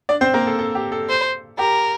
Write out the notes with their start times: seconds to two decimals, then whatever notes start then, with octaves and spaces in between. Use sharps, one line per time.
0.09 D4 D5
0.21 C4 C5
0.34 A#3 A#4
0.47 A4
0.59 A4
0.75 G4
0.92 A4
1.09 C5
1.59 G4 A#4